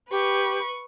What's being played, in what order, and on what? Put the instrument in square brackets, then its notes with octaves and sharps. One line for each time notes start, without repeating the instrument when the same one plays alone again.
[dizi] G4 [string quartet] B4 C#6